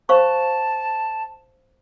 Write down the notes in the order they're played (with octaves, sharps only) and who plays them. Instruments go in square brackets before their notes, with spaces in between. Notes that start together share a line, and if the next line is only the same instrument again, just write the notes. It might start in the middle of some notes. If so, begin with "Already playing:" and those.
[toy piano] C5 F5 C#6 [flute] A5